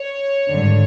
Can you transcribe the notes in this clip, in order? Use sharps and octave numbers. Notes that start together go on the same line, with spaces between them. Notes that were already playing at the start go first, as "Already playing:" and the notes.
Already playing: C#5
G#1 G2 D3